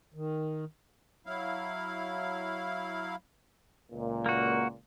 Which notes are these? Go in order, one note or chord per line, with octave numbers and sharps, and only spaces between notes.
D#3
F#3 E4 F5
C#2 A#2
A#3 F#4